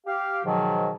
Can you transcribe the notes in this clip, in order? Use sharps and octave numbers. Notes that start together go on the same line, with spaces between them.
G4 F5
G#2 B2 D#3 F3 F#3